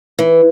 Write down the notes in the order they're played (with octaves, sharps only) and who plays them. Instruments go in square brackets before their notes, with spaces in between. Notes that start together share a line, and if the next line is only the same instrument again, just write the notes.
[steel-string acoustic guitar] E3